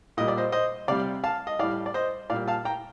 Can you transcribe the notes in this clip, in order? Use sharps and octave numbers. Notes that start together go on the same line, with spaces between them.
A#2 G3 D#5
D5
C5 D#5
C5 D#5
C3 G3 D5 F5
F5 A5
D#5
A2 G3 D5 F5
D5
C5 D#5
A#2 G3 D5 F5
F5 A5
G5 A#5